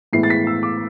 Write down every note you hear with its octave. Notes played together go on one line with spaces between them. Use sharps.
A2 E3 G#3 B3 E4 C7
A6
B6
E6
D6